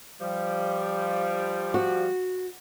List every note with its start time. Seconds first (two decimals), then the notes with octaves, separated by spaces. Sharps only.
0.21 F3 G3
1.74 F#4